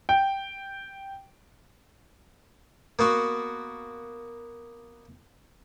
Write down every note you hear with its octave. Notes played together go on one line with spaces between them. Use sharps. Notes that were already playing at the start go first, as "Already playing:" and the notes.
G5
A#3 B3 F#4